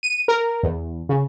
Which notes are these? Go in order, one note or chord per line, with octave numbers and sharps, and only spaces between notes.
D#7
A#4
E2
C#3